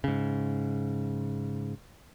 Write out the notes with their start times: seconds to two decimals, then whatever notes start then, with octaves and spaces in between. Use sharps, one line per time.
0.04 G#2 C#3